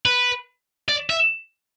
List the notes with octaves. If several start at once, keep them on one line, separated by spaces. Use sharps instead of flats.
B4
D5
E5